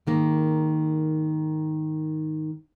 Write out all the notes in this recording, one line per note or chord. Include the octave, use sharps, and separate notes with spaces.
G#2 D#3 A#3